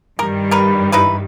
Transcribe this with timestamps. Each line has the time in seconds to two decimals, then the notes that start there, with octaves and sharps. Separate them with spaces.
0.19 G2 D#3 G3 A#4
0.51 A#4 B4
0.92 D#4 E4 B4